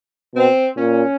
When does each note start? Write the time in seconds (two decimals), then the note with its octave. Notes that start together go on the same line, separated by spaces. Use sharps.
0.35 B2 C4
0.77 A#2 C#4